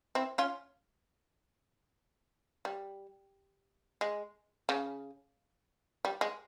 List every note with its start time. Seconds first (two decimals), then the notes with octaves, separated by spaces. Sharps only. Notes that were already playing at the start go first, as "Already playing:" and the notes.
0.15 C4 E4
0.38 C#4 F4
2.65 G3
4.01 G#3
4.69 C#3
6.05 G3
6.21 G#3